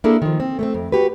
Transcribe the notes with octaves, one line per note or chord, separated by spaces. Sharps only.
A#3 D4 E4 G#4 A4
D#3 F3
C4
A3 B3 C4
F2
F#4 G4 B4